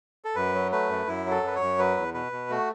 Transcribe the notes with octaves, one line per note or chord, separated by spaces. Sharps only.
A4
F#2 B4
F#3
A3 B4
F#2
F#2 E4
F#3
A4
F#2 B4
C#5
F#2
F#3 B4
E2
B2 B4
B2
A3 F#4